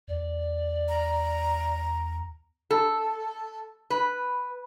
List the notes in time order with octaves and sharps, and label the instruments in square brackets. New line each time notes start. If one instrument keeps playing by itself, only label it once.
[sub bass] E2 [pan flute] D5
[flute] A#5
[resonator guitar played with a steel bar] A4
B4